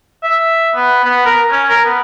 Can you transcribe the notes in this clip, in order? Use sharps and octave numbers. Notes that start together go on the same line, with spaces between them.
E5
B3
B3
A#4
C#4
A#4
B3